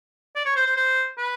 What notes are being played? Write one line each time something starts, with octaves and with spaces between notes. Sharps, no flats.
D5
C#5
C5
C5
C5
B4